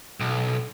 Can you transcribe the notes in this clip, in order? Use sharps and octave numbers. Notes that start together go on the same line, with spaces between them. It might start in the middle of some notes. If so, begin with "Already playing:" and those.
B1